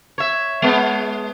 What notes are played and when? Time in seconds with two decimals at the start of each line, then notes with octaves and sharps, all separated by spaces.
0.18 C#5 E5
0.62 G#3 B3